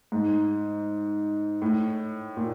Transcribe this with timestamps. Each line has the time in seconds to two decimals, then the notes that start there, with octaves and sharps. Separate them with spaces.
0.12 G#2
1.62 A2
2.37 A#2